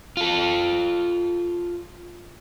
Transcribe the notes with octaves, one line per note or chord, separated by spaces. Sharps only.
F4 A4